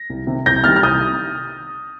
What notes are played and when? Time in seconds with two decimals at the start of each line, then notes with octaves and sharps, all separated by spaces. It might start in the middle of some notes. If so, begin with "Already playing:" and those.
Already playing: A#6
0.10 C2
0.27 C3 D#3
0.46 C2 G6 A#6
0.64 C3 D#3 G3 F6 A6
0.76 F6
0.82 C2 D#6 G6